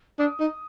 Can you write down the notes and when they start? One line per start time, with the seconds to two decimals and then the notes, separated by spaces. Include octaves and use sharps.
0.19 D4 D#6
0.40 D#4